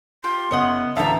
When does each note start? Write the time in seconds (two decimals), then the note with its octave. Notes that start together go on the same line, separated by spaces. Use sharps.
0.24 F4 G4 C6
0.51 F#1 B3 C#5 D#5 F#5 C#7
0.97 A1 D2 E5 F5 A5 A#5